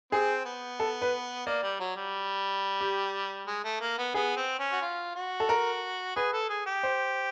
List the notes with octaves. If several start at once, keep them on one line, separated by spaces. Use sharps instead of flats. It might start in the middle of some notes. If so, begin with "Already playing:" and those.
C4 G#4
B3
A4
B4
A#3 D5
G3
F#3
G3
G4
G#3
A3
A#3
B3
B3 G#4
C4
C#4
F#4
F4
F#4
A4
A#4
G#4 B4
A4
G#4
G4
C5